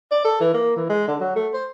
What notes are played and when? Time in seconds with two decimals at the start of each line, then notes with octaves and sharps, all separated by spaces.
0.11 D5
0.25 A4
0.41 E3
0.54 A#3
0.76 E3
0.90 G#3
1.08 D3
1.20 F#3
1.36 A3
1.54 C5